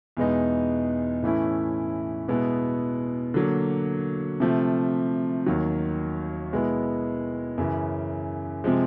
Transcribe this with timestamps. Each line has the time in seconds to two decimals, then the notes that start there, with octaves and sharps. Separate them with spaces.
0.17 E2 B2 G#3 B3 D#4
1.23 A2 E3 A3 C#4 E4
2.28 B2 G#3 B3 E4
3.34 D3 F#3 A#3
4.40 C3 F3 A3
5.46 D#2 D#3 F#3
6.53 B2 G#3 B3 E4
7.58 F#2 C#3 E3
8.64 C3 F3 G#3